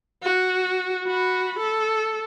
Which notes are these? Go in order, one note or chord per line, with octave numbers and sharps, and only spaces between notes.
F#4
F#4 B5
A4